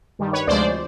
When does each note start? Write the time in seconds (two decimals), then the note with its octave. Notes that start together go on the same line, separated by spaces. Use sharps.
0.19 G2 D#3 G3
0.33 B4 C#5
0.47 D2 C3 F3 G#3 C5 D5